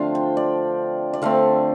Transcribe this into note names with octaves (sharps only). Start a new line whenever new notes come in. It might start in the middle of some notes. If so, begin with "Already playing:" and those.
Already playing: D3 F3 A3 C4 D4 F4 F5
G5
D5
D5
D3 A3 C4 F5